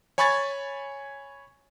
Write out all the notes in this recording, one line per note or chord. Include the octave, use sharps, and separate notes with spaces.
C#5 G#5 B5 C#6 G#6 A6